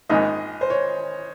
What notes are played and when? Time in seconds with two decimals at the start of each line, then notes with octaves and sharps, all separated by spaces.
0.09 A#1 G#2 D#3 D#5
0.61 C5
0.70 C#5